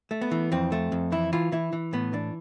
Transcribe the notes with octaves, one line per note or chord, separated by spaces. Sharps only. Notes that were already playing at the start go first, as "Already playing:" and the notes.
A3
B3
E3
F2 C4
A3
F2
E3 E4
E3 F4
E3 E4
E3
A2 B3
E3 D4